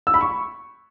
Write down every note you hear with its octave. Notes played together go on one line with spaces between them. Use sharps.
E6
B5
C#6